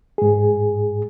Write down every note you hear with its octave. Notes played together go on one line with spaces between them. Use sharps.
G#2 G#4